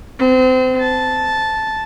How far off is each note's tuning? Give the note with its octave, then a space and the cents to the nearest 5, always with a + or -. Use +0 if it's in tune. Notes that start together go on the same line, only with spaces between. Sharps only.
C4 -30
A5 -5